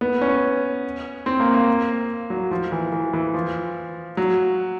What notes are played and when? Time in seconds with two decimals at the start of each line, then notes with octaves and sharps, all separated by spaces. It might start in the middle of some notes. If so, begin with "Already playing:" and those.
0.01 B3
0.21 C#4
1.26 C4
1.40 A#3
1.54 A#3
2.30 F#3
2.51 F3
2.72 E3
2.92 E3
3.14 E3
3.34 F3
4.17 F#3